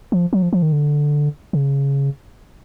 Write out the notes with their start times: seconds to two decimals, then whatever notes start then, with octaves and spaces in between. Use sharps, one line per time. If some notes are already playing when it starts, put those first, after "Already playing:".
0.12 F3
0.33 F#3
0.42 F3
0.53 F3
0.62 D#3
0.72 D3
1.53 C#3